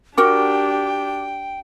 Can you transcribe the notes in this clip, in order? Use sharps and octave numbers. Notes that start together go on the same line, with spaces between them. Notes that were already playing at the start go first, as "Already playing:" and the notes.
D4 F#4 G4 A#4 F#5 G5 D6